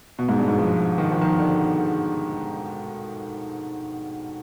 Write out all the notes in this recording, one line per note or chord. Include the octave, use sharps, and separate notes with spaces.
B2
G#2
G2
G#2
F3
D#3
F3
D#3
D3